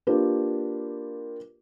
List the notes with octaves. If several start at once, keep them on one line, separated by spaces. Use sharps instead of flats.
A#3 D4 F4 G4 B4